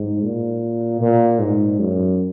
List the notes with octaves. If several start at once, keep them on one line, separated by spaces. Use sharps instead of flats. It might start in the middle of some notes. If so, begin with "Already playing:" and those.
Already playing: G#2
A#2
A#2
G#2
F#2